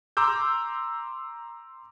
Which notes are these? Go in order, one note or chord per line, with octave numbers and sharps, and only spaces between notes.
A#5 C6 D6 E6 G6